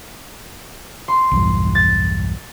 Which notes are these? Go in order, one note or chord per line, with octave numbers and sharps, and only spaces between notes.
C6
B1 E2 G2
A6